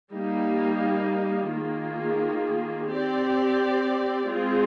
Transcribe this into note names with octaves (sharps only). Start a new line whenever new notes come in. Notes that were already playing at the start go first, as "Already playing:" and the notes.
G3 A#3 D#4
D#3 A#3 F4 G#4
C4 G4 D5
G#3 C4 F4 G#4